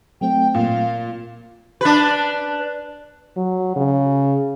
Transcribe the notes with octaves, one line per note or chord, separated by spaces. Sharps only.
F#3 A3 C4 G5
A#2 F5
D4 B4
F#3
C#3